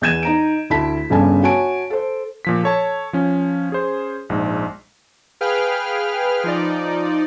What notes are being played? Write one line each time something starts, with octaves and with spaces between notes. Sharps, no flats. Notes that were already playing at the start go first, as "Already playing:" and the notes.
E2 E3 G6 G#6 D#7 E7
D#4 A#5 D7
D2 E4 A5 B6
G1 G2 C#3 A4 G#5 A5
F#4 C#5 G#5 A5 D7
A4 C5
A#2 F3 B6
A4 C#5 A5
F3 C#4
C#4 G#4 C5
A#1 G#2
G#4 B4 F5 G5 F6
F3 D#4 D5